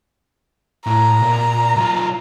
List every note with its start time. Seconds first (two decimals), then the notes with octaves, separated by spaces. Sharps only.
0.86 A2 A#5
1.22 A#2
1.76 B1 F4